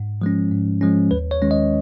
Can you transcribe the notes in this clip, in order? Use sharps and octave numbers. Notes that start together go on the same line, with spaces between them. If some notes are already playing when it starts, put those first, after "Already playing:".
Already playing: G#2
F3 G#3 C#4
G#2
F3 G#3 C#4
D#2 B4
C#5
D#3 G#3 C#4
D#5